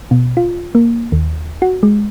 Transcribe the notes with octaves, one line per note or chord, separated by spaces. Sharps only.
B2
F4
A#3
D#2
F#4
G#3